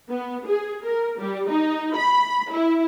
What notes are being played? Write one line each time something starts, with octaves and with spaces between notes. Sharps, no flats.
B3
G#4
A#4
G3
D#4
B5
E4